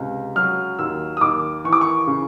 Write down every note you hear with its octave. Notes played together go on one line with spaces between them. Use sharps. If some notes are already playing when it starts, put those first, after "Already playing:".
Already playing: C#2 C3
F#3 F6
D#2 E6
D#6
D#2 D6
E3 C#6
D6
C#6
C#3